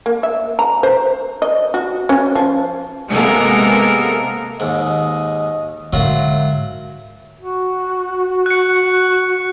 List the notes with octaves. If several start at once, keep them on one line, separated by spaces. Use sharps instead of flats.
A#3
E5
A#5
C5
D#5
F#4
C#4
F3
C3 G#3 A#3 B3 A4 A#4
D#2 G#2 D#5
G#2 D3 F#3 F4 A#4 E5
F#4
F#6 C#7